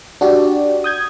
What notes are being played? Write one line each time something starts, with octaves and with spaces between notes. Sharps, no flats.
D4 F#4 G4 D5
D#6 G6 G#6